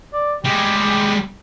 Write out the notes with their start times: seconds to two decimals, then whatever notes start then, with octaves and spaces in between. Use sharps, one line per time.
0.13 D5
0.44 G3 G#3 G4